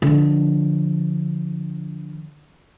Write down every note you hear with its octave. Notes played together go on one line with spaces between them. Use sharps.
D3 F3